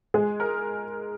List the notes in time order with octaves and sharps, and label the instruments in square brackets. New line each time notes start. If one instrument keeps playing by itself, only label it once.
[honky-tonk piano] G#3 G#4
A#4